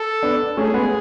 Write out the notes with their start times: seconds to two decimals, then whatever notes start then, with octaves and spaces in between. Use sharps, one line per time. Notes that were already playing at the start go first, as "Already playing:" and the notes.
Already playing: A4
0.23 B3 D4
0.57 A3 C#4 G#4
0.74 G#3 B3